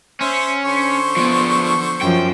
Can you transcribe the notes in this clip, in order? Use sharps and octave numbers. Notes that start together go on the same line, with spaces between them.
C#4 C5 E5
D3 C5 C#6
F3 B3 D5
F#2 F3 G5